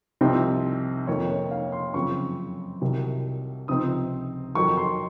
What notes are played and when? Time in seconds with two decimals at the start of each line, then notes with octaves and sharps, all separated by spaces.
0.21 C2 C3 F3 C4 D#4
1.07 F2 D#3 A#3 C#4 C#5
1.30 C#5
1.51 F5
1.72 C6
1.94 F#2 C#3 F3 C4 C#6
2.81 C2 C3 D#3 F#3
3.68 C#2 C3 F3 C4 D#4 D#6
4.55 F2 D#3 F#3 C#6
4.77 C6